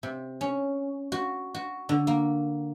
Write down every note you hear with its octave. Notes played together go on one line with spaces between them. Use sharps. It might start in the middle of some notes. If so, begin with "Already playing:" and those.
C3
C#4
F#4
F#4
D3
A#3